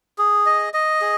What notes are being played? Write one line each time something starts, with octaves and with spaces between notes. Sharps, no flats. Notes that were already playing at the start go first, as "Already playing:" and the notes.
G#4
D#5
D#5
G#4